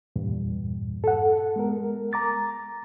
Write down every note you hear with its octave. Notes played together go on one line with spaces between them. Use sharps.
E2 G2 A#2
A4 F#5
G#3 B3 A#4
A#5 D6 A6